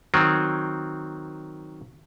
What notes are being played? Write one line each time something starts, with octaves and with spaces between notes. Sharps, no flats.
D#3 F#3 C4